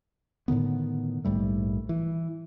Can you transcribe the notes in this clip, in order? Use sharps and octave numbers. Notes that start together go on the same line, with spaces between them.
A2 D3 D#3 B3
A#1 G#2 G3 A3
E3